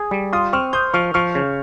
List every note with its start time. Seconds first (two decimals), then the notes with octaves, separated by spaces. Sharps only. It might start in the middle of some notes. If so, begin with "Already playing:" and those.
Already playing: G#4
0.11 G3
0.33 F4 C6 D#6
0.53 C4 C#6 F6
0.73 C5 D#6 G6
0.93 F3 C#6 F6
1.14 F3 C#6 F6
1.35 C#3